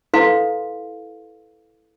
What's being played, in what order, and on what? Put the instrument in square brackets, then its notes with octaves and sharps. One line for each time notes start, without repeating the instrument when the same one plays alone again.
[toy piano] E4 A4 B4 F5 C6